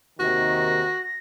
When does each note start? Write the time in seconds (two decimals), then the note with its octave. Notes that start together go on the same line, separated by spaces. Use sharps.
0.20 D#2 C3 D#3 F#4 A#6